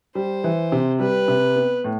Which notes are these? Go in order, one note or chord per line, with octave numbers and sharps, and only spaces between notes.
G3 C5
E3
C3
G3 B4
C3
B3
A2